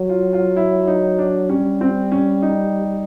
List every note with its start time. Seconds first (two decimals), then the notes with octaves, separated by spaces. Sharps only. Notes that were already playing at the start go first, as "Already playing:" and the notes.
Already playing: F#3
0.09 F4
0.33 F4
0.56 E4
0.87 D#4
1.19 D4
1.49 G3 C#4
1.81 C4
2.12 C#4
2.42 D#4